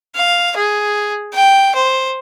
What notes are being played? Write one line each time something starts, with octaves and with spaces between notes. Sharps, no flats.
F5
G#4
G5
C5